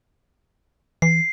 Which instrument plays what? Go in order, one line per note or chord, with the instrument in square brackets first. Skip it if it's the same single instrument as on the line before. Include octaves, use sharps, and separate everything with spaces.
[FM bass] E3 [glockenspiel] C7